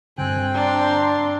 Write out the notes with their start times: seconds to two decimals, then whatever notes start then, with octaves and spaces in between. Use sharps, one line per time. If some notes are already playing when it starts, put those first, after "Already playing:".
0.18 G2 D3 C4 G5 G#5 F#6
0.54 D4 A#5 C6